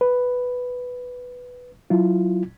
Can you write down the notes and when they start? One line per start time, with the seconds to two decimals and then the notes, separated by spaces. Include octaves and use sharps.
0.01 B4
1.90 F#3 E4 F4